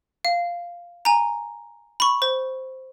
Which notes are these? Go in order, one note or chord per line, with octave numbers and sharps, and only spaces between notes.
F5
G#5 A#5
B5 C#6
C5